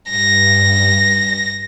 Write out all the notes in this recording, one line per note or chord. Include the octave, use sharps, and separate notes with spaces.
G2 A#6